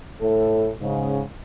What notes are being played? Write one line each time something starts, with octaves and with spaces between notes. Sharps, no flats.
A2 A4
G#2 C#3